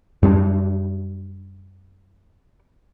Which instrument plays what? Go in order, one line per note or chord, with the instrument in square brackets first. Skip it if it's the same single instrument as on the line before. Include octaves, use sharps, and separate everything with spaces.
[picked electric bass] F#2 G3 C4 D4